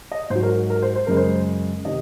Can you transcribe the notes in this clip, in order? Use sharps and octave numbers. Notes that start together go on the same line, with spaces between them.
D#5
G#2 C5
F#3
A#4
A#4
C5
C5
F#2 C#3 G#3 A#4
C5
C3 D#3 D#5